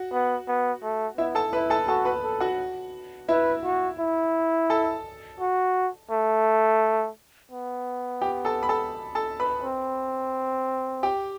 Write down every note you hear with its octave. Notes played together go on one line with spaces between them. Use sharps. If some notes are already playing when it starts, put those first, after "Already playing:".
Already playing: F#4 F#5
B3
B3
A3
B3 E4 E5
A4 A5
E4 B4 B5
A4 A5
F#4 A4 A5
B4 B5
A4
F#4 F#5
E4 B4 E5
F#4
E4
A4 A5
F#4
A3
B3
G4 G5
A4 A5
B5
A4 A5
A4 A5
B4 B5
C4
G4 G5